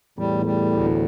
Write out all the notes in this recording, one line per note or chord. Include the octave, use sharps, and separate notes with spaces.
E2 A2 G3
G3
D2